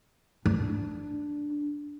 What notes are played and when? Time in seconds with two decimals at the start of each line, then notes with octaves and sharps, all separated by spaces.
0.46 D4